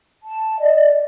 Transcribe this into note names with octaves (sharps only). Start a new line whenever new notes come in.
A5
D5 D#5